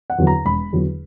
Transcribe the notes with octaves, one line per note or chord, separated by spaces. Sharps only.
F#5
E2 D3 F#3
A#5
E1 B5
E2 D3 F#3